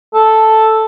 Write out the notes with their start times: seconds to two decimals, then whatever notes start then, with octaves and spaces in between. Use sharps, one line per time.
0.14 A4